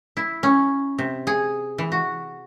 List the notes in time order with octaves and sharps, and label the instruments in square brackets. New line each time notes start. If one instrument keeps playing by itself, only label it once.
[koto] E4
C#4
C3
G#4
E3
F#4